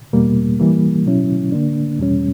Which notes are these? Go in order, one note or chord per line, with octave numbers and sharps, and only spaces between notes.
E2 B2 G3 A#3
E3 G3 A#3
B2 F#3 C#4 E4
D3 A#3 D4
E2 B2 G3 C#4